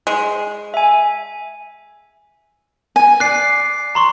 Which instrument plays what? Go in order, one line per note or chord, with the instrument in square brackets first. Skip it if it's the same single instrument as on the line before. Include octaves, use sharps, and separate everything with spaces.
[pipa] G#3
[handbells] E5 G#5
[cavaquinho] G#5
[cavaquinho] D5 [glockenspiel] F#6 C7
[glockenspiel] A#5 C6 C#6